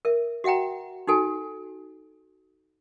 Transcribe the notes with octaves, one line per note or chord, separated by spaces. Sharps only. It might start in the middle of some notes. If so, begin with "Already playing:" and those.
A#4 E5
F#4 E5 F#5 G5 A#5
D#4 F#4 A4 G#5